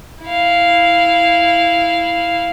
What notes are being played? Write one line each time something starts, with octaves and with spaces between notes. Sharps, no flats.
E4 F5